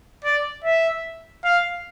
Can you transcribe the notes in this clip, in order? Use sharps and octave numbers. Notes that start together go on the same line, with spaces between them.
D5
E5
F5